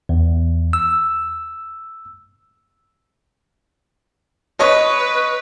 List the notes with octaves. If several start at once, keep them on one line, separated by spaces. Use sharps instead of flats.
E2
E6
B4 C#5 D#5 C#6